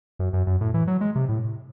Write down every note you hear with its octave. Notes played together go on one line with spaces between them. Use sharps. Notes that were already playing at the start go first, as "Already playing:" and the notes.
F#2
F#2
F#2
A2
E3
F#3
G#3
C3
A2